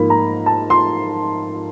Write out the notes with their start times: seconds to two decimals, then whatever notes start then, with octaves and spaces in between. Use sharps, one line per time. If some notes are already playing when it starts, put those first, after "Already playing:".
Already playing: G#2 F3 A#3 B5
0.10 A#5
0.46 A5
0.70 C6